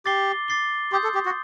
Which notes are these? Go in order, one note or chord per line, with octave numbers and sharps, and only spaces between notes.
G4 D6 A6 C7 G7
D6 A6 C7 G7
G4 C6 D#6 G6
A4
G4
F#4